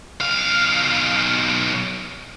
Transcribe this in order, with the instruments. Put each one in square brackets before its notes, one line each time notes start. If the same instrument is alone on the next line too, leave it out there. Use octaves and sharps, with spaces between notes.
[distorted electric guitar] B1 F5